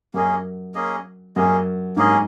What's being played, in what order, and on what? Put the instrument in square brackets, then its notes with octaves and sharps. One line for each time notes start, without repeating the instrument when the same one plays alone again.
[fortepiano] F#2 [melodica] A#3 C#4 G#4 D#5
[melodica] A#3 C#4 G#4 D#5
[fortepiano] F#2 [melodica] A#3 C#4 G#4 D#5
[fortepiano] G#2 [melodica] A#3 C#4 G#4 D#5